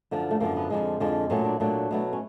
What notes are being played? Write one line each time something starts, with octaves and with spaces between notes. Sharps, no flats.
F#2 D3 F3
A3
F#2 D3 F3 A#3
B3
F2 D3 F3 G#3
F2 D3 F3 G#3
A#2 F#3 A3 C#4
D4
A#2 F#3 A3 D4
B2 F#3 A3
C#4